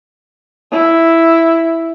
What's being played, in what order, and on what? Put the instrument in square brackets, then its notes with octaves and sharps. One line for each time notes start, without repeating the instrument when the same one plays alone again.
[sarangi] E4